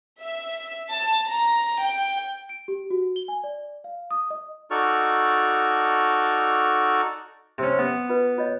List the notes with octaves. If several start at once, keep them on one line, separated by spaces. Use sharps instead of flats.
E5
A5
A#5
G5
D7
G4
F#4
G7
G#5
D5
F5
D#6
D#5
D#4 F#4 A4 D5 C#6 F6
C3 C#4
B3
F4 B4
F4 C#5 D#5